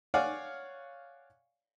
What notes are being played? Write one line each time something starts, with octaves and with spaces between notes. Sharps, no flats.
C#5 D5 F5 F#5 G#5